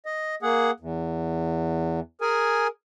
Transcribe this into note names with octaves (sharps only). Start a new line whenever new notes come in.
D#5
A#3 G#4 F#5
E2
G#4 A#4 G#5